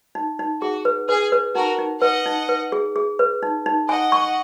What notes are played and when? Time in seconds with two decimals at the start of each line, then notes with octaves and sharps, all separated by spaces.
0.15 D#4
0.39 D#4
0.62 F#4 G#4
0.85 B4
1.09 G#4 B4
1.32 B4
1.55 D#4 F#4 A#4
1.78 D#4
2.02 B4 D#5 F#5
2.26 D#4
2.49 B4
2.72 G#4
2.96 G#4
3.19 B4
3.43 D#4
3.66 D#4
3.89 D#5 F#5 G#5
4.12 C#6